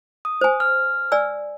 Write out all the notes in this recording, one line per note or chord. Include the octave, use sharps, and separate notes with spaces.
D#6
C5 G#5
F6
D5 G#5 E6